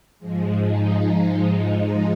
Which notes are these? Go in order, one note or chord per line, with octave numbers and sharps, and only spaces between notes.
G#2 F3 G#3
D#4